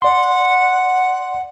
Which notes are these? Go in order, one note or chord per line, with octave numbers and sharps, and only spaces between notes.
D5 F#5 C6